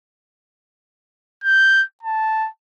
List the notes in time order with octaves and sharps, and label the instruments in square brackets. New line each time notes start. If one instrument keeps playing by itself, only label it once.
[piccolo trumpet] G6
A5